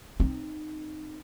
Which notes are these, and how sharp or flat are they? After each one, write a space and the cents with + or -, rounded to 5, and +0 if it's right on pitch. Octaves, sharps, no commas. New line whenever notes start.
C4 +0 D#4 -15